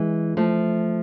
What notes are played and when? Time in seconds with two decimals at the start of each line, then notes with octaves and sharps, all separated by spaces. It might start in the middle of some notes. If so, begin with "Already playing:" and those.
Already playing: E3 G#3
0.37 F3 A3